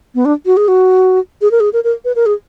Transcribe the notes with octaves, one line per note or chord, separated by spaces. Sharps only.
B3
D4
F#4
G#4
F#4
G#4
A#4
G#4
A#4
A#4
B4
A#4
G#4